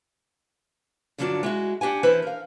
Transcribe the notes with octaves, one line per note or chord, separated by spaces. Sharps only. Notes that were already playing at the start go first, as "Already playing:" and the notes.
G2 D3 F3 F#3 D4 D5
G#3 E4 F#4
D4 G4 F#5 G#5
E3 E4 B4 C5
A#4 F5